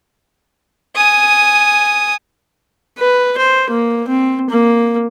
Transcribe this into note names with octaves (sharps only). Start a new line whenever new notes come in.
G#5 D#6
B4
C5
A#3
C4
A#3